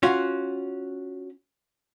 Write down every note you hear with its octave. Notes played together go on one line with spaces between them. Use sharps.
C#4 F4 F#4